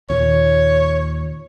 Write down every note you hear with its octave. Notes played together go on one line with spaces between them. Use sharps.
D#2 A#2 C#5